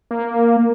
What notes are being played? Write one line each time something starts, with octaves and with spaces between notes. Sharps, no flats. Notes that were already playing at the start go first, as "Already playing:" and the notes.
A#3